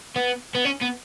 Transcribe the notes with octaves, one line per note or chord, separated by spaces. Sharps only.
B3
B3
C#4
B3